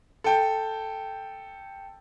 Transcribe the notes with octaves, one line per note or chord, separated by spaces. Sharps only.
A4 G5